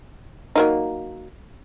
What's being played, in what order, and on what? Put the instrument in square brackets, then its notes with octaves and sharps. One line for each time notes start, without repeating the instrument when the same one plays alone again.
[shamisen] F#3 A#3 D#4